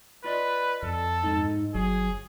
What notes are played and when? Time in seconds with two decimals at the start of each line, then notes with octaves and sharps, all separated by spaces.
0.24 F4 B4 D5 D#5
0.83 F2 A4
1.23 G#2 D#4
1.74 G1 F#3 G#4